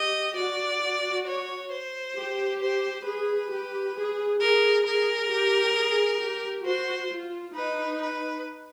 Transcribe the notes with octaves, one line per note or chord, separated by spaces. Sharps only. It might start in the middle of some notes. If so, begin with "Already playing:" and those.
Already playing: G4 D#5
F#4 D5
F#4
C#5
C5
G4
C5
G#4 B4
G4
G#4
G#4 A#4
G#4 A#4
G4
G#4
G4
F#4 C5
F4
D#4 B4
B4